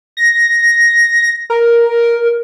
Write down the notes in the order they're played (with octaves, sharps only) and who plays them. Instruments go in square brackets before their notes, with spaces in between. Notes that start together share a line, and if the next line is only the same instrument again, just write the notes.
[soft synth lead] A#6
A#4